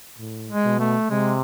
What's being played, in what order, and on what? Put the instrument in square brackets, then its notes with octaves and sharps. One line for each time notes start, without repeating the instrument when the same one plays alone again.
[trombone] A2
[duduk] G#3
[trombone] B2
[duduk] A3
[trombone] C3 [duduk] G#3